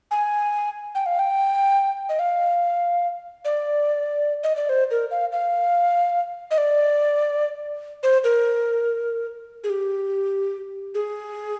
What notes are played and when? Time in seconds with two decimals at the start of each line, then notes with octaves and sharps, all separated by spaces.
0.11 G#5
0.95 G5
1.06 F5
1.19 G5
2.09 D#5
2.19 F5
3.45 D5
4.44 D#5
4.56 D5
4.69 C5
4.91 A#4
5.11 F5
5.32 F5
6.51 D#5
6.58 D5
8.03 C5
8.24 A#4
9.64 G#4
9.70 G4
10.95 G#4